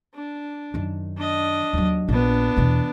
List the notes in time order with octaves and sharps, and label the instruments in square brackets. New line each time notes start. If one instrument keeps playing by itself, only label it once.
[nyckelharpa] D4
[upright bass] F#2 D#3
[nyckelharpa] D4 D#5
[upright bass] D#2 F#3
[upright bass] A#1 [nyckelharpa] B3 D4
[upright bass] E2 B2